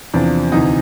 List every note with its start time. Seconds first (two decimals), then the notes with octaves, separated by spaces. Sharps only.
0.14 E2 C3 F3 D4
0.52 D2 C3 E3 D#4